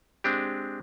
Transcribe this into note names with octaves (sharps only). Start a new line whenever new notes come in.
G#3 C4 D4 G4